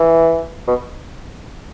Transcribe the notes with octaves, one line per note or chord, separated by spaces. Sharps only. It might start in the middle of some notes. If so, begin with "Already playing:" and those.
Already playing: E3
B2